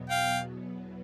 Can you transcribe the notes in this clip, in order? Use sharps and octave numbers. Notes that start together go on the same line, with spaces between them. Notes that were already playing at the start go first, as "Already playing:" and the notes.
Already playing: E2 B2 F#3 B3
F5 G5